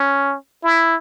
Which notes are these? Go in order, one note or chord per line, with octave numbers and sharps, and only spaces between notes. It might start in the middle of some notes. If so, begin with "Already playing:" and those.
Already playing: C#4
E4